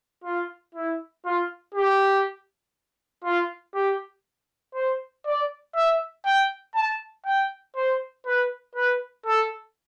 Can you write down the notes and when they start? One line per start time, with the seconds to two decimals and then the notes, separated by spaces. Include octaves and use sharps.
0.24 F4
0.75 E4
1.25 F4
1.75 G4
3.24 F4
3.75 G4
4.74 C5
5.25 D5
5.75 E5
6.25 G5
6.75 A5
7.26 G5
7.76 C5
8.26 B4
8.75 B4
9.26 A4